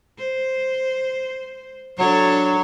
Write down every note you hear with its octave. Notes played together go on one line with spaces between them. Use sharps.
C5
F#3 D4 A4 C#5